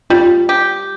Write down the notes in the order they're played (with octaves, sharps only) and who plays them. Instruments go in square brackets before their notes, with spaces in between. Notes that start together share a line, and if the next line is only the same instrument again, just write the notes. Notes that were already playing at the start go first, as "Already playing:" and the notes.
[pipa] G3 [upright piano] F4
[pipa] G4